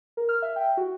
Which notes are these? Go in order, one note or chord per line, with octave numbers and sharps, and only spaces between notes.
A#4
F6
E5
G5
F#4